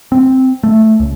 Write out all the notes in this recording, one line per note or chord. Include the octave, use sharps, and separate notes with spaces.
C4
A3
C#2